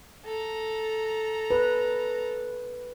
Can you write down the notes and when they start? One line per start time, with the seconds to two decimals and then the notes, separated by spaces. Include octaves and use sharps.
0.25 A4 A#5
1.51 B4